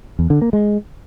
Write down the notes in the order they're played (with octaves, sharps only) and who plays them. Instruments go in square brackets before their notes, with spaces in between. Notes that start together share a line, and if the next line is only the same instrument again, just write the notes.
[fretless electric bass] E2
D3
A#3
G#3